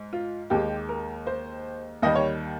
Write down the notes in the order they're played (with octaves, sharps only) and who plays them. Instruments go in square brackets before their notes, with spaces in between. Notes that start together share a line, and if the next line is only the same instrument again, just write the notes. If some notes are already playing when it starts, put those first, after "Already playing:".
Already playing: [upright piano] G#2
F4
D#2 D#3 G#3 G4
A#4
C5
D#2 D#3 G3 D#5
C#5